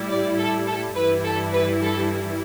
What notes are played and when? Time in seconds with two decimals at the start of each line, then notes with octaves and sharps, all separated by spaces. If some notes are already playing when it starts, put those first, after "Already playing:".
Already playing: A2 G3 E4
0.09 D5
0.38 A4
0.67 A4
0.95 G2 E3 G3 E4 B4
1.23 A4
1.53 B4
1.82 A4